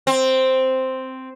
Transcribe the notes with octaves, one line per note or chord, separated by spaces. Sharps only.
C4